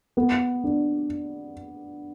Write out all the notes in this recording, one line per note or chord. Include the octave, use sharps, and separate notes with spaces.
B3
D4